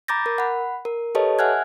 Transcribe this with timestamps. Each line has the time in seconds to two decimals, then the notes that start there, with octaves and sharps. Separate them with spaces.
0.08 A#5 B5 D6 G6 A6 A#6
0.26 A#4
0.38 F#5 B5
0.85 A#4
1.15 G4 A4 B4 C#5 D#5 A5
1.39 E5 F#5 G#5 F6 F#6 G#6